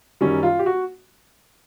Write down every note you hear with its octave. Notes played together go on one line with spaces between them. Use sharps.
F#2 D#3 G3 C#4
F4
G4
F#4